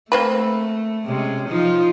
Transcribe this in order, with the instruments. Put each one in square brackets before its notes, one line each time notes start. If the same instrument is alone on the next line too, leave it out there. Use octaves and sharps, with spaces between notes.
[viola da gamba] A3 [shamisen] A#3 C4 B4
[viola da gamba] C3 G#3 C#4
F3 D#4 F4